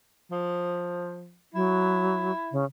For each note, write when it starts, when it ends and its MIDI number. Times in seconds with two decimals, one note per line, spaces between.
0.31 1.37 53
1.54 2.31 54
1.54 2.60 64
2.52 2.64 49